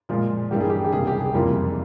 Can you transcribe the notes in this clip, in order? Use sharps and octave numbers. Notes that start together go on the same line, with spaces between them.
A#2 F3 G#3 F4
G2 E3 G3 A#3 G4
G#4
G4
G4
C#2 C3 G3 A#3 G#4
G4
G#4
F2 E3 G3 A#3 F4